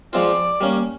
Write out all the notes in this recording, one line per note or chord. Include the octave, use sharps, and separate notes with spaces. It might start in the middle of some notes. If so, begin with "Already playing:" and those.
F3 G#3 C4 F4 D5
G3 A#3 C#4